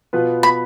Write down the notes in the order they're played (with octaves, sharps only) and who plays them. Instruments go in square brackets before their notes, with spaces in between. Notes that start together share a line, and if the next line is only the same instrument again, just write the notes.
[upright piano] B2 B3 F4 B4
[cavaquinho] B5